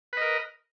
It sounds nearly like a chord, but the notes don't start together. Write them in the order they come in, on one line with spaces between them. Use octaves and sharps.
B4 D#5 A#4